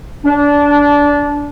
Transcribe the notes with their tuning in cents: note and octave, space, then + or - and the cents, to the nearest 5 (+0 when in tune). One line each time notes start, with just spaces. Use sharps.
D4 -20